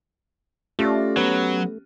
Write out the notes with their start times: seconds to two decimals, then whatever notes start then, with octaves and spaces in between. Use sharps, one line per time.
0.79 A3 C#4 F4 G4 D5 A#6
1.17 F#3 B3 B4